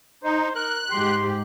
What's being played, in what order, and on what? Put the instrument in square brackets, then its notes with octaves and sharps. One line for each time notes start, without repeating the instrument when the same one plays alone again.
[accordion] D#4 [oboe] C5
[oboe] A#4 [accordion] F#6
[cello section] G#2 G4 [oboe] C6